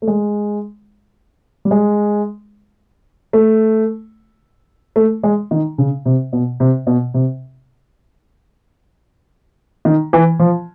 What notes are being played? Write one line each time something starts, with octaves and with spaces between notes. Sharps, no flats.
A3
G#3
G3
G#3
A3
A3
G#3
D#3
C#3
C3
B2
C3
B2
C3
D#3
E3
F3